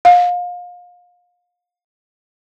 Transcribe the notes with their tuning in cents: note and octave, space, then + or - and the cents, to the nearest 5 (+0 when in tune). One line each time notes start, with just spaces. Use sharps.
F5 +30